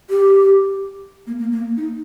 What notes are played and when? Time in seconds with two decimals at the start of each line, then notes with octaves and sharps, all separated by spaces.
0.10 G4
1.27 A#3
1.39 A#3
1.52 A#3
1.77 D#4